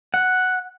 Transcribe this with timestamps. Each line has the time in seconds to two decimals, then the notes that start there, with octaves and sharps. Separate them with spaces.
0.14 F#5